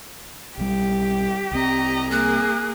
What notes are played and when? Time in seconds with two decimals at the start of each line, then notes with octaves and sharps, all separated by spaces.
0.58 B1 G3 G4
1.51 C2 C4 D#5 A#5
2.11 A#3 G#4 F#6